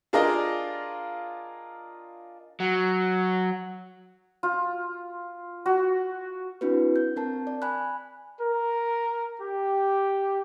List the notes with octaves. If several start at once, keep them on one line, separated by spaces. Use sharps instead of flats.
D4 F4 G#4 A#4 D5 D#5
F#3
F4
F#4
C4 D4 E4 F#4 B4
G6
C4 A#4 A5
D5
G#5 B5 F#6
A#4
G4